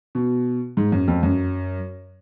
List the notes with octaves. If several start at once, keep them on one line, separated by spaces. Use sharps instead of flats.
B2
G#2
F#2
F2
F#2